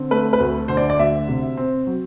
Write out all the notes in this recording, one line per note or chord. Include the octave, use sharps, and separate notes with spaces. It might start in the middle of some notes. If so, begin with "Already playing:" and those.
Already playing: D3 C4
A3 B4
B4
D2
D3 C5
D5
D5
D2 E5
C3
C4
F#3